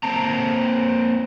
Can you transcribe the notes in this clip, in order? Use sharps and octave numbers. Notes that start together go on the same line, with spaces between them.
A#3 C4 A5 A#5